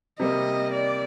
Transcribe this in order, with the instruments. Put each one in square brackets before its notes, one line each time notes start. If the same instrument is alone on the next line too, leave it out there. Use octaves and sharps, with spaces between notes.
[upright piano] C3 G3 A#3 [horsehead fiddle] D#5
[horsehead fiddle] D5